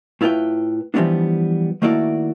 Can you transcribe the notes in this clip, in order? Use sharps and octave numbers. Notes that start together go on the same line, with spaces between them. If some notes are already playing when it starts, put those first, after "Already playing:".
A2 E4 F4 G#4 B4 G5
E3 F3 G3 A#3 B3 D4
D#3 A3 A#3 E4 F#4 D5